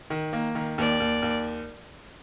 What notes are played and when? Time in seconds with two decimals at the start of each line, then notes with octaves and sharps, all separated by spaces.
0.10 D#3
0.33 A#3
0.55 D#3
0.78 D#2 D5
1.00 D#2
1.22 D#2